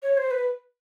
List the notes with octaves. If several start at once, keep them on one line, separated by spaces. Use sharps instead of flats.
C#5
C5
B4